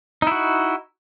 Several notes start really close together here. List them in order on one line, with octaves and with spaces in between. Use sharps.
D#4 E4 F#4